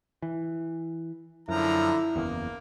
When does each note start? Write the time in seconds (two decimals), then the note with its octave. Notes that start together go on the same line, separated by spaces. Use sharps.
0.22 E3
1.49 F#2 D3 F3 E4 A#5
2.16 F#1 E2 A#3